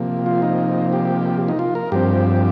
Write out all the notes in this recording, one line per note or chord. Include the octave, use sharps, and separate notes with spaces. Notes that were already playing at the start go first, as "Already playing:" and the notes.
Already playing: C3 F3 A#3
F4
D#4
G4
D#4
F4
A#4
G2 F3 C4 G4